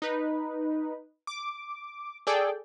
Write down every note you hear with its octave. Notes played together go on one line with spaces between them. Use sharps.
D#4 B4
D6
G#4 A4 D5 G5